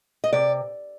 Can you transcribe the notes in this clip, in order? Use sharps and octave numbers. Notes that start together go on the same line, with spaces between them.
D#5
C3 D5